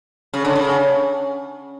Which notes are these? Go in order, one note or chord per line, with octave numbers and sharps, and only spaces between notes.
C#3
D3
C#3